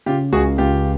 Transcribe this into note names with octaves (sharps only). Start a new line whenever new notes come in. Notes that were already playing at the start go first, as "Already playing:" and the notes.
C#3 F4 G4
C#2 F#4 G#4
C#2 F4 G4